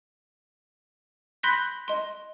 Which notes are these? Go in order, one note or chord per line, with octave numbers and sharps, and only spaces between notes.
B5 C6 F#6 G6 A#6 B6
D#5 C6